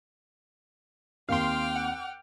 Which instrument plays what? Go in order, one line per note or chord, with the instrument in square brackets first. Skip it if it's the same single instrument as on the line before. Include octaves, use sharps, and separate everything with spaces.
[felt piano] D#2 C4 A#4 [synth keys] F5 C6 [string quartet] G5 D6 F6
[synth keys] F#5